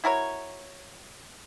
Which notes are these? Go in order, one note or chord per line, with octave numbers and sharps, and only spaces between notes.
E4 F#4 A#4 C#5